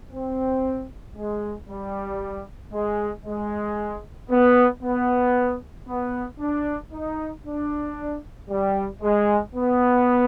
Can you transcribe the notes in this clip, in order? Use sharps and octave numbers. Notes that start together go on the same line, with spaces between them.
C4
G#3
G3
G#3
G#3
B3
B3
B3
D4
D#4
D4
G3
G#3
B3